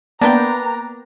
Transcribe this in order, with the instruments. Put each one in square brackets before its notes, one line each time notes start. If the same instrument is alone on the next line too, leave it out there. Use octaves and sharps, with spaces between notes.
[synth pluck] A#3 B3 G5 [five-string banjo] D4 B4 [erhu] A#5